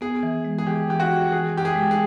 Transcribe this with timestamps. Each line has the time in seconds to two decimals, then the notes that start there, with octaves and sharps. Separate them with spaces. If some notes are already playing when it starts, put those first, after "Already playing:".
0.01 B3 G#4
0.23 E3
0.45 G#3
0.58 G#4
0.67 E3 G4
0.89 E3 G4
1.00 F#4
1.10 E3
1.31 E3 G#4
1.53 E3 G4
1.65 G#4
1.75 G#3
1.91 G#4